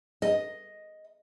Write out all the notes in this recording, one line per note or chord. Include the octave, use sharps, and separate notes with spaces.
D#5